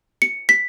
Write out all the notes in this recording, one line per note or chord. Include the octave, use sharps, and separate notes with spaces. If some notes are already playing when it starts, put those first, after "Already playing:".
C#7
B6